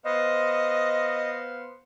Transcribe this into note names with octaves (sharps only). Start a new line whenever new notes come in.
B3 C5 D#5 F5